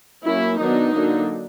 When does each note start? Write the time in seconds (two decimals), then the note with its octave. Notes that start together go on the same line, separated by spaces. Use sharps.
0.25 F#3 A#3 C#4 E4
0.59 D#3 F#3 B3 D4 D#4
0.94 D3 F#3 A#3 D4